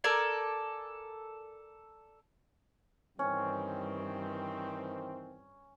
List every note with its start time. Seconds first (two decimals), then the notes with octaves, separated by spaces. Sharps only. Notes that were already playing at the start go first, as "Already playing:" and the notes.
0.04 A4 A#4 D5 G#5
3.19 G2 D#3 E3 C4 C#4